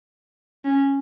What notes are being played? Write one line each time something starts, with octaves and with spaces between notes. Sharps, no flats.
C#4